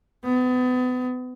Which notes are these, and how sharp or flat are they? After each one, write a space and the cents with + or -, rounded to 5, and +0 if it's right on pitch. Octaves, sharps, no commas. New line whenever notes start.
B3 +35